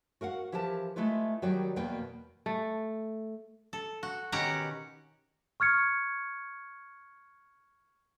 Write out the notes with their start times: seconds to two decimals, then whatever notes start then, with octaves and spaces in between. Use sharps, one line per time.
0.21 F#4 A#4 F5 F#5
0.52 E3 F3 G4 A#4 A5
0.96 G#3 A3 E4 F4 B4
1.42 D#3 F#3 G3 F#4 D5 G5
1.76 E2 B2 A#3 B4 G5
2.46 A3
3.73 A4
4.03 F#4
4.32 B2 D#3 C#4 G4 F#5 A#5
5.60 C#6 F6 G#6 C#7